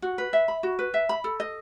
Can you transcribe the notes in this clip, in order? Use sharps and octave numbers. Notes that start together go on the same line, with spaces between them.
F#4
B4
E5
B5
F#4
B4
E5
B5
A4
D#5